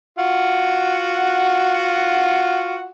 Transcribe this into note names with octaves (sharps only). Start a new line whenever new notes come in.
F4 F#4 F#5